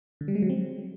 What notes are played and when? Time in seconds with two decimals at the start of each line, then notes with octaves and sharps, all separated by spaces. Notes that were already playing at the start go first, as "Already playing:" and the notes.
0.21 D3
0.28 G3
0.35 G#3
0.42 F#3
0.50 C4